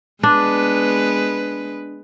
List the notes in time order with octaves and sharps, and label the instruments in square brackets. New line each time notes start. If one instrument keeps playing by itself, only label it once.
[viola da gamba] G#3 B3 B4 [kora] D4